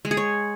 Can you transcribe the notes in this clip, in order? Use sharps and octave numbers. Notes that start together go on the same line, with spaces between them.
G#3
G#4
C#5